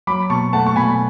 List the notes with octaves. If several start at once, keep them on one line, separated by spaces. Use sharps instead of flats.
F#3 B5 D6
B2 A5 C#6
A3 F#5 A5
C#6
B2 G#5 B5